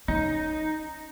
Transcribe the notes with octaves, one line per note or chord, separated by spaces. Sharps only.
C#4 D#4